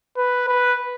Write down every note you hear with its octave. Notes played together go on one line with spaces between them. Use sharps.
B4
B4